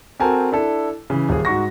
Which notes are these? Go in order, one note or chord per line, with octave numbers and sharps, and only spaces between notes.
C4 F#4 A4 A#4 G#5 A5
D4 E4 A4
C#3 E3
D#1 G#4
G#2 F#4 C#6 A#6